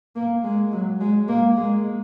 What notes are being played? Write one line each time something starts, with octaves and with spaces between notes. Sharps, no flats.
A#3
G#3
F#3
G#3
A#3
G#3